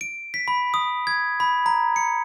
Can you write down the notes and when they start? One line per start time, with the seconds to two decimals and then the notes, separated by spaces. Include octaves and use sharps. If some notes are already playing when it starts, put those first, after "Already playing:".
0.01 D7
0.34 B6
0.48 B5
0.74 D#6
1.07 G#6
1.40 B5
1.66 A#5
1.96 C#7